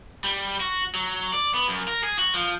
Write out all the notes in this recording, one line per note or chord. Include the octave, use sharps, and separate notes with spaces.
G3
F#4
F#3
D5
B3
F#2
A#4
G#4
F#4
F3